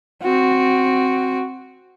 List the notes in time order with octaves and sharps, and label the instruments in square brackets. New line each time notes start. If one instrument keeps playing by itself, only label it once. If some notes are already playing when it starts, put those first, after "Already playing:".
[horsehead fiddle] C4 F#4